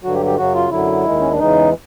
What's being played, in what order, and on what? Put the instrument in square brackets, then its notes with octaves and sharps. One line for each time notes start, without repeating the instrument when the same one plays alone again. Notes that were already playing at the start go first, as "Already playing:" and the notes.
[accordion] G2 D3 F#3 F#4
G4
G4
F#2 C#3 F#3 F#4
F4
F#2 D3 F#3 E4
D#2 D#3 G#3
C#4
D4
E2 C#3 E3 G#3 D#4